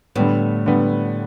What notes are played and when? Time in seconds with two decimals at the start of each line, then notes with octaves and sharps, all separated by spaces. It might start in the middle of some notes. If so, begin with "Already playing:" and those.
0.16 A2 D3 G3 B3
0.66 D3 G3 B3